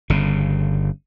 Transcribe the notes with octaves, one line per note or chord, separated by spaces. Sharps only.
G1 C#3